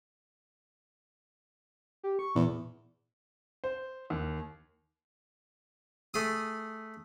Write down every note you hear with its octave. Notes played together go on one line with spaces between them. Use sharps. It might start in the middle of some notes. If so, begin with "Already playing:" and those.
G4
C#6
E2 A#2
C5
D#2
A3 G#4 D#6